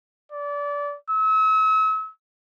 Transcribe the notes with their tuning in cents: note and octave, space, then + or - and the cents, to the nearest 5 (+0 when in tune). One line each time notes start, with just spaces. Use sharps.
D5 -25
E6 -40